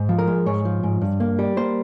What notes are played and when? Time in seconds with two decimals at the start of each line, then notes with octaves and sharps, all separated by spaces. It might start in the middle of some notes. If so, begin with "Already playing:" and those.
Already playing: G#2
0.09 F3
0.19 A#4
0.27 G#3
0.46 G#2 C#5
0.65 F3
0.83 G#2
1.02 G2
1.20 A#3
1.39 G3
1.57 A#3 C5